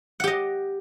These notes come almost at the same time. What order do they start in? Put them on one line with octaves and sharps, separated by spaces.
F#5 G4 D#5